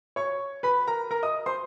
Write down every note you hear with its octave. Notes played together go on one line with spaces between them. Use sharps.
C#5 C#6
B4 B5
A#4 A#5
A#4 A#5
D#5 D#6
C5 C6